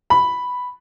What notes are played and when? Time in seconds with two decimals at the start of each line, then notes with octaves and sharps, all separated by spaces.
0.10 B5